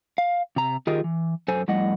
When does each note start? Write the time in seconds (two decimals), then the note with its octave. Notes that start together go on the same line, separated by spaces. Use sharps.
0.18 F5
0.56 C3 A#5
0.87 D#3 F4 G4 G#4 A#4 D#5
1.04 E3
1.48 F#2 A4 C5 G#5
1.68 F2 A2 G3 D#5 F#5